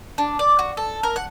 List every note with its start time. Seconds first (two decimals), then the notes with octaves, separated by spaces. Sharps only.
0.18 D4
0.39 D5
0.59 F#4
0.77 A4
1.03 A#4
1.16 F#5